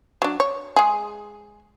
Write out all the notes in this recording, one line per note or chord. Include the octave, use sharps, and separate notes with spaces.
F#3 D4
C#5
G#3 G#4